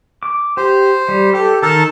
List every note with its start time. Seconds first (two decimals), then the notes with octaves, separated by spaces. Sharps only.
0.23 D6
0.57 G4 C5
1.09 G3
1.34 G4 A4
1.63 D#3 A4 A#4 A5